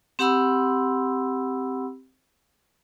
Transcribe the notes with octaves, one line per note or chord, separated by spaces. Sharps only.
C4 G4 F#5 B5 C6 E6